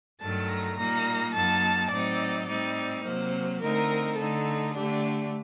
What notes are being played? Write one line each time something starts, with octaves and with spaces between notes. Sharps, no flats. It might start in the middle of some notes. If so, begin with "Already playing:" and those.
G2 D#3 F#3 A3 A5
A#5
A#2 G3 A#3 D#4 A#5
F#2 F#3 A#3 D#4 A5
A2 F#3 C4 D#4 D5
A2 G3 C4 D#4 D5
C3 F#3 A#3 C5
D3 A3 C4 D#4 A#4
D3 A3 D#4 A4
D3 A3 D4 G4